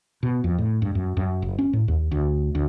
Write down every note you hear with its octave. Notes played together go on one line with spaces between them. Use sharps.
B2
F2
A2
G2
F#2
F#2
F#1
C#4
A2
D#2
D2
D2